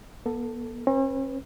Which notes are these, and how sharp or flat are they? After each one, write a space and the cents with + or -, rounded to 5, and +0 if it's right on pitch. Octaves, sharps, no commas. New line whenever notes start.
B3 -40 A4 +10
C#4 -45 B4 +0